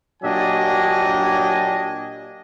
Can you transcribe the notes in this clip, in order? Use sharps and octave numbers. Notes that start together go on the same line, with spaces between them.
A#2 F#3 D4 G4 D#5 G#5